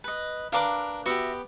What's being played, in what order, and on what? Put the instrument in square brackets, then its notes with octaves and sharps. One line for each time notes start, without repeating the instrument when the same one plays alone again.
[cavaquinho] B4 D#5
[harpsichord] D4 A#4 B4 [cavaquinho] F5 D6
[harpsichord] B3 G4 [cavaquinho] F#4 E5